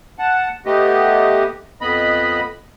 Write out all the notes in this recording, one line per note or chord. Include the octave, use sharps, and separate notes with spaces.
F#5 A5
A3 B3 G4 D#5
F2 B3 D#5 B5